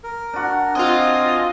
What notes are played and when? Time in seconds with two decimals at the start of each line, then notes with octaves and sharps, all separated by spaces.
0.04 A#4
0.34 D4 F#4
0.75 C4 F4 D#5 G#5 D#6